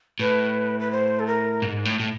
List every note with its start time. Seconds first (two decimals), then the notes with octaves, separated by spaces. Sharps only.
0.19 A2 B4
0.80 B4
0.91 C5
1.19 A4
1.27 A#4
1.62 G#2
1.85 A2
2.00 A2